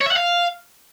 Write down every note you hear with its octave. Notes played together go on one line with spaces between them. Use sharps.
C#5
E5
F#5
F5